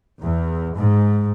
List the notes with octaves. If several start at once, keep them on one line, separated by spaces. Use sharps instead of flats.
E2
G#2